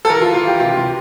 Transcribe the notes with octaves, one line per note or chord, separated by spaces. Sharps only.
A4
E3 A#4
F4
E3
F4
E3 G4
C3 F4
C3 F4